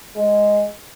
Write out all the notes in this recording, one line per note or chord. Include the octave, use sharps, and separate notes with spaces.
G#3